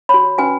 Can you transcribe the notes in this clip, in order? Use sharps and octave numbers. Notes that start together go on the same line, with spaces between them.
F#4 C#5 B5
C#4 F#4 B4 G#5